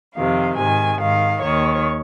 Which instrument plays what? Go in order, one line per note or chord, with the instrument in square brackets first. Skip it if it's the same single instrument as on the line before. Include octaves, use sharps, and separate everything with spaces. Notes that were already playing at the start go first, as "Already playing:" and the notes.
[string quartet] F2 C3 D#3 F5
G#2 D#3 G#5
G#2 D#3 F5
D#2 D#3 C#5